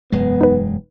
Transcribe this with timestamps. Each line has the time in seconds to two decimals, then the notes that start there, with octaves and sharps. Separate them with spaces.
0.12 E1 F#2 G#3 B3
0.41 D#4 B4